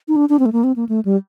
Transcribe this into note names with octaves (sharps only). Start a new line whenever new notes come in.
D#4
D4
D4
C4
A3
A#3
C4
A#3
A3
G3